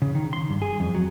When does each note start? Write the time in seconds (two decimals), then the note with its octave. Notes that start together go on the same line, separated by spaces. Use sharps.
0.02 C#3
0.15 D#3
0.33 C6
0.50 G2
0.62 G#4
0.80 F2
0.95 F#3